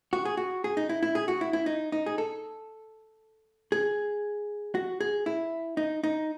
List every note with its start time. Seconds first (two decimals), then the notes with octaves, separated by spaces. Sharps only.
0.13 F#4
0.25 G#4
0.37 F#4
0.64 G#4
0.77 D#4
0.89 E4
1.03 E4
1.15 G#4
1.28 F#4
1.41 E4
1.53 E4
1.66 D#4
1.92 D#4
2.06 G#4
2.18 A4
3.72 G#4
4.75 F#4
5.01 G#4
5.26 E4
5.77 D#4
6.04 D#4